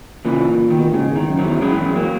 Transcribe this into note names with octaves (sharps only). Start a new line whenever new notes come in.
A#2 C#3 E3
D#3
B2
A#2
G#2 C#3
E2
D#3
F#2
D#3 F#3
E2
F#2 E3 G#3
F#2
E2
F#3 A#3